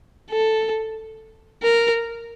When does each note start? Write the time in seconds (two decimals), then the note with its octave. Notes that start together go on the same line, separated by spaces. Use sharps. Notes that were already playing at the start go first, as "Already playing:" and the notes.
0.31 A4
1.63 A#4